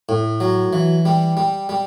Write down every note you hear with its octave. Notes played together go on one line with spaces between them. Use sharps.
A2
F#3
E3
G3
G3
G3